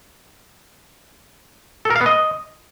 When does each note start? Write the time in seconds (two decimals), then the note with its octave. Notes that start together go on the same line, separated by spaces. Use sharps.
1.85 A4
1.90 A#4
1.96 F5
2.01 B3
2.06 D#5